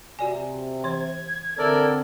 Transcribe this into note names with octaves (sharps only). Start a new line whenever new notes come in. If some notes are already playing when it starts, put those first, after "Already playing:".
C3 F#4 D5 G#5
E3 C5 G#6
D3 C4 A4 A#4 C5 D5 E5